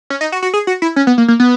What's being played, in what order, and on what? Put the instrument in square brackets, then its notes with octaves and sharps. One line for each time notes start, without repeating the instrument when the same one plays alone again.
[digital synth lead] C#4
D#4
F#4
F#4
G#4
F#4
E4
C#4
B3
A#3
A#3
B3